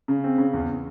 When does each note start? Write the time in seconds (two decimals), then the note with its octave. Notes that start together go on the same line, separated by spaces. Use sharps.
0.08 C#3
0.24 C4
0.38 C#3
0.53 E2